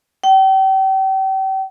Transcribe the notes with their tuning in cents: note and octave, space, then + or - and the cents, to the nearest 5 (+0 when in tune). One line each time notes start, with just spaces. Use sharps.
G5 -35